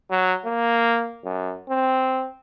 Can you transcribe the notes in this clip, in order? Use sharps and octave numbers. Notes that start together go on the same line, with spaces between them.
F#3
A#3
F#2
C4